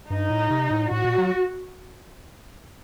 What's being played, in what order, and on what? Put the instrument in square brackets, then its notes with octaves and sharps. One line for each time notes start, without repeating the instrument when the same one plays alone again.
[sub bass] G2 [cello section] D#4
[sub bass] A2
C3
A2
[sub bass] A2 [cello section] F#4
[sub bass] A#2
F#3